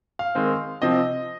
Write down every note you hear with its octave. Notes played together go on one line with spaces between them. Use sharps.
F5
D#3 G#3 C4
C3 F3 C4 D#5